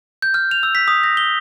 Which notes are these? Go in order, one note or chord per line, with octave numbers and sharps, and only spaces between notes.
G6
F6
F7
E6
B6
D#6
A#6
G7